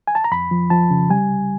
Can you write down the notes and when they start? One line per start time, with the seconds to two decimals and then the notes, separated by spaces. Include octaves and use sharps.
0.07 G#5
0.15 A5
0.24 A#5
0.32 F2 B5
0.51 F3
0.70 F3 A5
0.90 C#3
1.10 G3 G#5
1.29 C2